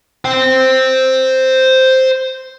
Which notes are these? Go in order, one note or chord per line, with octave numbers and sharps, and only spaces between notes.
C5 G5